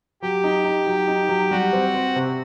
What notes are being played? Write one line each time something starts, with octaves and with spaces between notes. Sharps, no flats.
F#3 G4
D#4
D#4
F#3
D#4
F#3
G3 F#4
C4
C4
C3